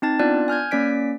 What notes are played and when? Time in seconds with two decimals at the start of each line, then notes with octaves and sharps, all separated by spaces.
0.02 C4 D#4 A5 A6
0.19 B3 D4 F4 D5 F#6
0.48 G#5 F6 G6 G#6
0.71 A#3 C#4 D5 B6 D7